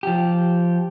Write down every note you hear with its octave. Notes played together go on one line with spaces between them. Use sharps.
F3 G4